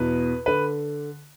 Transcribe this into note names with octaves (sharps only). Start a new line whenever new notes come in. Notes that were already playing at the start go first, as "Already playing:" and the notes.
Already playing: E2 B2 B4
D3 B4